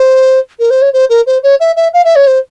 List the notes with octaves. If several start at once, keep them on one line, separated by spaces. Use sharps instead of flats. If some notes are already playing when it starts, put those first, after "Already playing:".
Already playing: C5
A#4
C5
C#5
C5
A#4
C5
C#5
E5
E5
F5
E5
C#5
C5